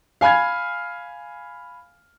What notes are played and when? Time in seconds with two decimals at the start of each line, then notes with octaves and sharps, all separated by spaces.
0.21 F5 G#5 B5 F6 G#6